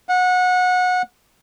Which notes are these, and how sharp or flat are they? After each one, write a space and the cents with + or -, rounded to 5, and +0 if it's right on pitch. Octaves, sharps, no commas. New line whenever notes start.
F#5 -25